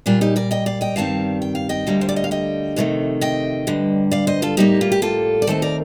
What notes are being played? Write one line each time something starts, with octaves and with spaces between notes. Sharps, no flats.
A#2 G3 A#3 D4 F4
D#4 G4
A#4 D5
D#5 G5
D5 F5
D#5 G5
G2 D#3 G3 C4 F5 A5
G5
F5
D#5 G5
D2 D3 G3 A#3
C5
D5
D#5
F5
D#5 G5
F2 C3 D#3 A3
D#5 G5
G2 D3 G3
D5 F5
C5 D#5
F4 A4
A2 G3 A#3 D#4 G4
F4
G4
F4 A4
D5
D#2 D#3 A3 C4 A4 C5
A#4 D5